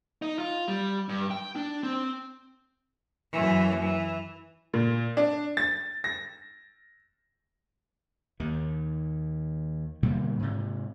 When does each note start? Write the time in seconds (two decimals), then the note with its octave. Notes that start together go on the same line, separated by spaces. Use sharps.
0.22 D#4
0.39 F4
0.68 G3
1.09 G2
1.31 G5
1.56 D4
1.83 C4
3.32 F#2 E3
3.83 E3
4.73 A#2
5.17 D4
5.57 A6
6.04 A#6
8.40 D#2 D#3
10.03 B2 D3 G3 A#3
10.39 G#2 C3